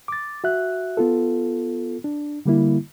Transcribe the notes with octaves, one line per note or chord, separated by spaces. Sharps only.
D6 A6
F#4 E5 F#6
B3 F4 A4
D4
D3 G3 A#3 E4